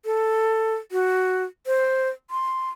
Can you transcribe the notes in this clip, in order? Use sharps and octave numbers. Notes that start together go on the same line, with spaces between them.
A4
F#4
C5
C6